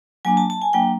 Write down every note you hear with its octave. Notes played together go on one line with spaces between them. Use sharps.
F#3 A#3 D4 G#5
A5
A5
G#5
F#3 A#3 D4 G5